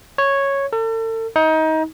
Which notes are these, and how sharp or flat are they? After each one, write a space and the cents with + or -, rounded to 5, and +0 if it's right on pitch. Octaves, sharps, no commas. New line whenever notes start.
C#5 -5
A4 +40
D#4 +25